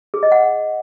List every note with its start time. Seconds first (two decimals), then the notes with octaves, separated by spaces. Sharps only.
0.14 G#4
0.23 D#5
0.32 F#5